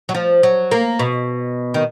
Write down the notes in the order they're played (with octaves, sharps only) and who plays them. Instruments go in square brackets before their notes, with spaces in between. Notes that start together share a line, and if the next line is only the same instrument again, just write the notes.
[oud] F#3
F3
F#3
A#3
B2
D#3